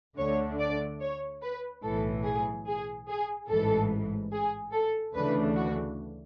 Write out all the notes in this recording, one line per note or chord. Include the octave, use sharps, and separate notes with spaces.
D2 D3 A3 D4 C#5
D5
C#5
B4
B1 A2 E3 A4
G#4
G#4
G#4
A1 G#2 E3 A4
G#4
A4
D2 C#3 E3 A3 D4 B4
F#4